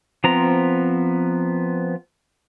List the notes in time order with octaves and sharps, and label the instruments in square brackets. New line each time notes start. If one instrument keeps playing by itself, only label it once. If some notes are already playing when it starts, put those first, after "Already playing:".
[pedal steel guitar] F3 B3 C4 A#5